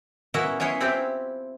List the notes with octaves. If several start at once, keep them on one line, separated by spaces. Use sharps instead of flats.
A#3 B3 C#4 E4 F#4 E5
B3 C#4 E4 C#5 C6
C4 E4 F4 G4 C5